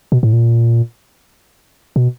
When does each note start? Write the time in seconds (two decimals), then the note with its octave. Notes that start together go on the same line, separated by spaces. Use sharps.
0.12 B2
0.23 A2
0.33 A#2
1.96 B2